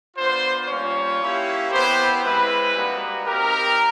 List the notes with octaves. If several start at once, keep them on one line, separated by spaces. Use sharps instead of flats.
B3 D4 F4 C5
G3 A#3 C#4 F4 C#5
A#3 C#4 E4 G4
B3 E4 G4 C5
G#3 C4 E4 B4
G3 A#3 D#4 F#4
C4 D#4 G4 A#4